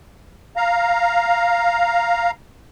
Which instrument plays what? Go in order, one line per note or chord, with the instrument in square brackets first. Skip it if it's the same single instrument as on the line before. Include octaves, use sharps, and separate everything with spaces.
[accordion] F5 A#5